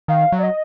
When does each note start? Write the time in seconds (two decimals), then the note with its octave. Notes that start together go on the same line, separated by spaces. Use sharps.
0.08 D#3 F5
0.32 F#3
0.39 D5
0.43 D#5